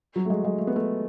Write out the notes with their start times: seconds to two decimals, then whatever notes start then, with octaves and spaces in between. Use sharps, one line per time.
0.16 F#3
0.25 A3
0.30 G#3
0.44 G#3
0.58 A3
0.67 B3
0.76 A3